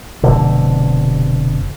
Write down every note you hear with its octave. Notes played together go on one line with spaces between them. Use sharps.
F1 B2 D3